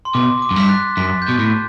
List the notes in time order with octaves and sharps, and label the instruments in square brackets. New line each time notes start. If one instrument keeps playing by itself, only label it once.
[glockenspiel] C6
[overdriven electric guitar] B2 [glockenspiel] D6
[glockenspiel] D6
[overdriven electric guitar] F#2
[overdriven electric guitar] G2 [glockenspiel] B6
[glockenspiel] F#6 A6
[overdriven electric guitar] F#2 [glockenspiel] B6
[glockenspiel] A6
G6 B6
[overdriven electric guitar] B2
A2